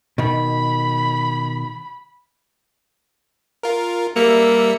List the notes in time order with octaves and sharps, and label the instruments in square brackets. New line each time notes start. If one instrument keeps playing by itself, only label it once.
[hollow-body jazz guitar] B2 D#3 [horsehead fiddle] B5
[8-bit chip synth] F4 A#4
[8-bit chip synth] G3 E5 C#7 [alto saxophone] A#3